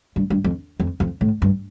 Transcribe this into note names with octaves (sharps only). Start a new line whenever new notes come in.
G2
G2
F2
F2
F2
A2
G2